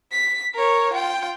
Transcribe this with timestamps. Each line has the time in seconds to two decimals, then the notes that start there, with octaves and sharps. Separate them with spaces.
0.12 B6
0.55 A#4 C#5
0.93 F4 G5